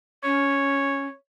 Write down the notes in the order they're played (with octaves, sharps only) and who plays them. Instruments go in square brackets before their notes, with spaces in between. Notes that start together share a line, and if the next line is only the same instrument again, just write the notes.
[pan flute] C#4 [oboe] C#5